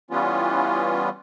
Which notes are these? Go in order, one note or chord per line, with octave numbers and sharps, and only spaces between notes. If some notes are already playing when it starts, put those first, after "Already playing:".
E3 G3 B3 C#4 F4